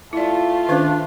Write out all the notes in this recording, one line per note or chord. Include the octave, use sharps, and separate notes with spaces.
A3 E4 F4 D5
D#3 C#4 D4 C5